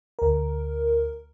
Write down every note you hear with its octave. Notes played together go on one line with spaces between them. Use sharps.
D2 A#4